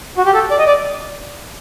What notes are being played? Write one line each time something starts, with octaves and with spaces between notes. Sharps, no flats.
F#4
G4
A4
D5
D#5
D5